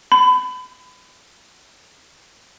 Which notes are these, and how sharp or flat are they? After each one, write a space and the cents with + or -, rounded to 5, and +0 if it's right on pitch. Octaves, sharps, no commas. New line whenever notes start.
B5 +30